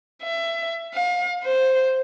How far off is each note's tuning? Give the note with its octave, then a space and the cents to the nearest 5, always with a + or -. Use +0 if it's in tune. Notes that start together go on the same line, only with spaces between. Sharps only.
E5 +25
F5 +35
C5 +0